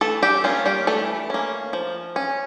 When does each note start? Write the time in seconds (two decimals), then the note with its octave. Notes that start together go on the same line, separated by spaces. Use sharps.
0.01 E3 A3 A4
0.23 G3 G4
0.44 A#3 C#4 F4
0.66 G3 G4
0.87 E3 A3 A4
1.30 A#3 C#4
1.73 F3
2.16 C#4